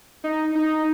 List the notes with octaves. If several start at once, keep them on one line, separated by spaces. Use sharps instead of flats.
D#4
D#4